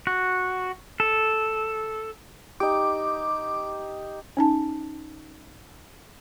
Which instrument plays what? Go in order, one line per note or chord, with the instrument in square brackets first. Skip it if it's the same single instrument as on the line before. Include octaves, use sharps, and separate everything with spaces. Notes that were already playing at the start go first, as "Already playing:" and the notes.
[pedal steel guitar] F#4
A4
[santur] D#4 G4 [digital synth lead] D6
[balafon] C#4 D#4 A5